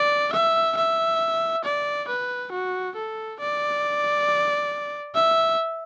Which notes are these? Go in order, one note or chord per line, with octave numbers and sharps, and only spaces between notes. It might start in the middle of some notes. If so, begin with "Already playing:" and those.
Already playing: D5
E5
E5
D5
B4
F#4
A4
D5
E5